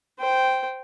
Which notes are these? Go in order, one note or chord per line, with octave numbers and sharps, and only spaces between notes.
C5 G5